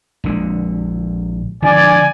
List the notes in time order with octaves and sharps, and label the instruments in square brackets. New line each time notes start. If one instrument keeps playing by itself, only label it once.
[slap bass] A#1 D3 G#3
[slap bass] D3 F3 G#3 [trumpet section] D5 G#5